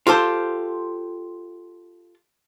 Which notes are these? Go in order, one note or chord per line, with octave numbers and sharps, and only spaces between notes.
F4 G4 A4 C5